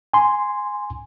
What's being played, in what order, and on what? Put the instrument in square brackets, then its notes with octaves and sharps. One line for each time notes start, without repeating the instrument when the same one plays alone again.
[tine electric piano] G#5 C6